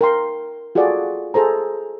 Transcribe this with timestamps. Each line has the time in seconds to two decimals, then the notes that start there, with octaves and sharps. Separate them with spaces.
0.01 A#4 G5 C6
0.75 F4 F#4 G#4 A4 D5 F#5
1.34 G#4 A4 C5 A#5